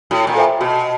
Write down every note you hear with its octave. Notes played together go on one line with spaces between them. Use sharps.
A2 F#4
A#2
A4 C5 E5 G5
B2 F#4